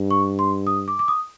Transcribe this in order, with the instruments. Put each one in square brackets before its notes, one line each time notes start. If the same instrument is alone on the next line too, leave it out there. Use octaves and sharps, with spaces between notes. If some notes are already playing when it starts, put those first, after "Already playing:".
Already playing: [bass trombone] G2
[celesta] C#6
C6
D#6
D6
D6
D#6